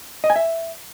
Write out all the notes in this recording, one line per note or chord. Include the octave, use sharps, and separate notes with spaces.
D#5
G#5
E5